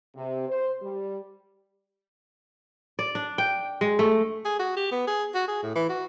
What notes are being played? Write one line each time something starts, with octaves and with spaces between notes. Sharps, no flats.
C3
C5
G3
D5
D4
G5
G#3
A3
G#4
F#4
G4
B3
G#4
F#4
G#4
A2
E3
F#4